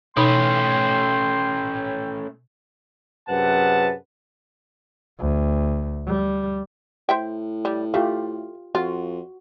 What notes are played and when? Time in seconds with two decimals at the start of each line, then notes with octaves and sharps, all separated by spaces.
0.17 B2 A3 C#4 D#4 G5 B5 C6
3.29 F#2 C3 G#4 B4 F#5 A5
5.19 D2
6.06 G3
7.09 A2 C5 E5 G5
7.65 G3
7.94 A3 F4 G4 F5
8.75 F2 F4 F#4